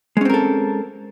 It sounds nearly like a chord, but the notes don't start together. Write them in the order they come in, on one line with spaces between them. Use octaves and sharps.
G#3 C#4 C4 A#4 A4